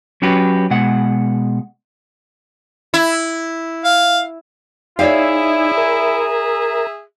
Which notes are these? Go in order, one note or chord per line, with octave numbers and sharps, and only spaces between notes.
F#3 C#4 F#4 G4 B4
B2 G#3 F#5
E4
F5
D#4 E4 G#4 C#5 D5 E5 F5
A#4